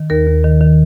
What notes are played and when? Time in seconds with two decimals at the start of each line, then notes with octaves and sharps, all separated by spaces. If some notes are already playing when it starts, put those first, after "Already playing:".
Already playing: D#3
0.10 D#2 A#4
0.27 D#2
0.44 D#3
0.61 D#3